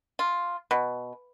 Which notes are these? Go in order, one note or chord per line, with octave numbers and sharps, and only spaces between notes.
F4
B2